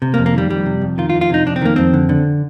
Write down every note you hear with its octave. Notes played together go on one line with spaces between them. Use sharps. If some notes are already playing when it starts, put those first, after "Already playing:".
C3
A#3
F2
A#3
D#3 G3
F2 G3
C3
F2
D#3 F4
F4
F2
F4
C3 D#4
F2 D4
C4
D#3 A#3
F2 C4
D3
D3